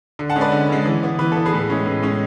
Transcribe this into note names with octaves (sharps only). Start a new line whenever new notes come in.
D3
F#5 A5
G#3 C#4
B4 D5
D3
G#3 C#4
E3
B3
E3 B4
B3 A4
G#4 B4
A2
G#3 C#4
A2
G#3 C#4